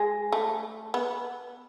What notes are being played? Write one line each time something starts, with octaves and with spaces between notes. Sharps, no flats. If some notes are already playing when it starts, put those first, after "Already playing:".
Already playing: G#3
A3
B3